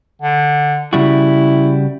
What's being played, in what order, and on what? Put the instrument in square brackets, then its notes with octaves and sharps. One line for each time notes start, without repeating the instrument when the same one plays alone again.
[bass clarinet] D3
[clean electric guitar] C#3 G3 F#4 [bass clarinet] E4